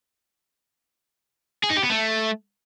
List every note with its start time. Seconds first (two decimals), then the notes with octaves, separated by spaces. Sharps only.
1.64 G#4
1.70 D#4
1.77 G4
1.83 B3
1.90 A3